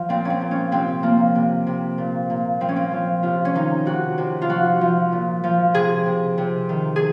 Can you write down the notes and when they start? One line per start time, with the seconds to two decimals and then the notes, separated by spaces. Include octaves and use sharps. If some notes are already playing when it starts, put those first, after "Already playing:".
Already playing: F3
0.09 A#2 C4
0.25 C4 C#4
0.41 A#2
0.51 C#4
0.72 C3 C4
1.03 F3 A#3
1.35 C3
1.67 C3
1.98 A#2
2.30 A#2
2.61 F3 C4
2.69 C#4
2.76 C4
2.92 F3
3.23 C3 F4
3.45 C#4
3.55 D#3 D#4
3.86 C3 F#4
4.18 C3
4.42 F4
4.49 F3 F#4
4.81 F3
5.12 A#2
5.44 F3
5.74 C3 G#4
6.06 C3
6.38 C3
6.69 D#3
6.96 G#4